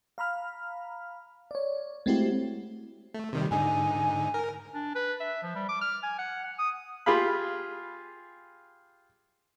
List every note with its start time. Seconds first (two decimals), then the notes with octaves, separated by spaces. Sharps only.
0.18 F5 A#5 B5 F6
1.51 C#5 D5
2.06 G#3 A3 C4 E4 F#4 G4
3.14 A3
3.33 C3 D#3 G3
3.51 G#2 D3 D#4 G#5
4.34 A#4
4.74 D4
4.95 B4
5.20 E5
5.43 F3
5.55 G3
5.69 D6
5.81 F6
6.03 G#5
6.18 F#5
6.44 F#5
6.59 D#6
7.06 F4 G4 G#4 F5 B5